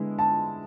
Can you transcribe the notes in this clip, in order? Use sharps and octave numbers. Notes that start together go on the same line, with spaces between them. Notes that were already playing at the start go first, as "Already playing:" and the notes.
Already playing: D3 G#3 B3 E4
A5